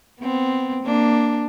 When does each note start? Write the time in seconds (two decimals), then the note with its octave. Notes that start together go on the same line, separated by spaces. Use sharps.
0.20 B3 C4
0.83 A#3 D4